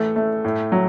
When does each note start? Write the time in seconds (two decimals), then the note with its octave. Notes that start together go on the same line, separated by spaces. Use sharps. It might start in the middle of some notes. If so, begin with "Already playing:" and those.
Already playing: A2 E3 A3
0.16 A3
0.45 A2
0.72 F#3